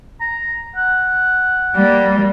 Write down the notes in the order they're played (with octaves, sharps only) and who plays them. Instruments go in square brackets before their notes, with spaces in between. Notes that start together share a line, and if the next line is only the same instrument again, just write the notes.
[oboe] A#5
F#5
[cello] G3 A#3